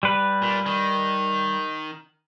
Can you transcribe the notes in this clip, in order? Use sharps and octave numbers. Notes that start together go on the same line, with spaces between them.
G3 B4
A#2
D#3